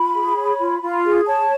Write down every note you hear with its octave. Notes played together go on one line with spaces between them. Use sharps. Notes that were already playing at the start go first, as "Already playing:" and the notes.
Already playing: F4 B5
G#4
C#5
F4
F4
G#4
C#5 A5